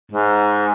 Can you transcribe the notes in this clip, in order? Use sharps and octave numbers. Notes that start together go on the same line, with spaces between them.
G#2